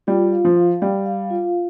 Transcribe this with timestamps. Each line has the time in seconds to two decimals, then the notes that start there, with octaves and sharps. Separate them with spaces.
0.07 G3 F4
0.32 F5
0.45 F3
0.56 F5
0.81 G3 F5
1.06 F5
1.30 F4